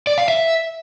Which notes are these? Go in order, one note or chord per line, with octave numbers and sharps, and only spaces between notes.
D5
F5
E5